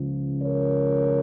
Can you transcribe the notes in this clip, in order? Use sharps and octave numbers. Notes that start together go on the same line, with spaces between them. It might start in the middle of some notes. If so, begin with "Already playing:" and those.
Already playing: C#2 C#3 F3
A#4 C#5